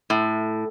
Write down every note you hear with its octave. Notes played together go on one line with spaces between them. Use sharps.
A2